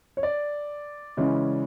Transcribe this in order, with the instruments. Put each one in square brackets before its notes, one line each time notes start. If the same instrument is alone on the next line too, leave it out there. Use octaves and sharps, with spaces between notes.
[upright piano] C#5
D5
C#3 E3 G#3 C#4 E4